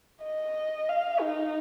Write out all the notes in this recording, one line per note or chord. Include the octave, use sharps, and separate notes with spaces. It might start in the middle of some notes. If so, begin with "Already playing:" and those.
D#5
F5
D#4